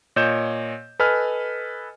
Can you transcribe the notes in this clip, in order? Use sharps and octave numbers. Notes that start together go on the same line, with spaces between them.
A#2 C#5 D#5 G6 E7
A4 B4 D#5 G#5 F6